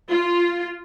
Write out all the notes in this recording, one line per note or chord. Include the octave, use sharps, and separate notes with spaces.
F4